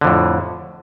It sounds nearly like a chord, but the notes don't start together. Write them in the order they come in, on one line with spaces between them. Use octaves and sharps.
D3 F2 A2